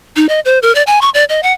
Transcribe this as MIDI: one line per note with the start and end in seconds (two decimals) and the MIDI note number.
0.16 0.26 63
0.29 0.40 75
0.45 0.59 72
0.62 0.74 70
0.75 0.83 74
0.87 1.01 80
1.01 1.10 85
1.14 1.24 74
1.29 1.41 75
1.43 1.52 78